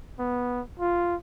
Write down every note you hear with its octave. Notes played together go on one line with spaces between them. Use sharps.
B3
F4